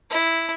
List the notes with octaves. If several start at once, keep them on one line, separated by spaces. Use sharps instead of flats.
E4